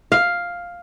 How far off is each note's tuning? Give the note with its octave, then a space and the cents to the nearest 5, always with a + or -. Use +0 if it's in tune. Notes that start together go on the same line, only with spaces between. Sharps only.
F5 +5